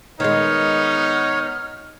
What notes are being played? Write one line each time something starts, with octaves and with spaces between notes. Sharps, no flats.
D#3 G#3 B3 D#4 C#5 F6